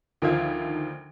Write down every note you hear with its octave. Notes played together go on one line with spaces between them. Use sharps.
D2 D#3 F3 F4 E5 G#6